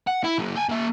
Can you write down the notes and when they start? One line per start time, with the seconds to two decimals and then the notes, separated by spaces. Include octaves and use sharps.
0.07 F#5
0.24 E4
0.39 F#3 A#3
0.56 G5 G#5
0.69 A#3 E5